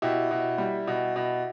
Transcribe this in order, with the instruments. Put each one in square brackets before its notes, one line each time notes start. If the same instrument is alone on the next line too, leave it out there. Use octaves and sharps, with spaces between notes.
[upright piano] B2 E4 G4
B2
G3
B2
B2